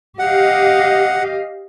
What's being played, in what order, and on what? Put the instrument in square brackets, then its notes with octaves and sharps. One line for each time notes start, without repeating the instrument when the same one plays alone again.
[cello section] G4 D#5 F5 [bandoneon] F#5